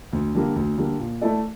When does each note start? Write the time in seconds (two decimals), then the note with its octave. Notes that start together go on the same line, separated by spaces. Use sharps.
0.13 D2
0.35 D3 G3 A#3
0.56 D2
0.78 D3 G3 A#3
0.99 A#2
1.21 A3 E4 A4 D5